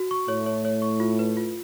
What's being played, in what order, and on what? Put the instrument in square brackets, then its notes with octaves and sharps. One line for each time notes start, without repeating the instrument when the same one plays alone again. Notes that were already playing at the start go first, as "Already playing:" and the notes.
Already playing: [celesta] F#4
C#6
[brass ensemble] A2 A3 [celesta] C#5
[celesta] C#5
C#5
C#6
F4
B4
F4